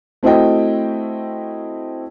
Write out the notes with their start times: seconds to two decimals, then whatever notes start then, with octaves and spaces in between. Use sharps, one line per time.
0.23 A3 C4 E4 F#4 D#5 G5